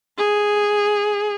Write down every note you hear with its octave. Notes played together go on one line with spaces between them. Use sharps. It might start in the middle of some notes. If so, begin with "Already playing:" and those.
G#4